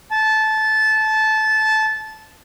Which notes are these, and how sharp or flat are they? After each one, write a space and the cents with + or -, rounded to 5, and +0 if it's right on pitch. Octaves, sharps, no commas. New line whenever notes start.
A5 -15